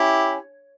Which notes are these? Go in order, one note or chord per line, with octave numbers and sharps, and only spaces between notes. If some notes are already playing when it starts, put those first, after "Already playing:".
Already playing: C#4 E4 G4